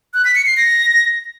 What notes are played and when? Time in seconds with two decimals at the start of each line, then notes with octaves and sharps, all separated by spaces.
0.14 F#6
0.25 B6
0.35 C#7
0.46 C7
0.57 A#6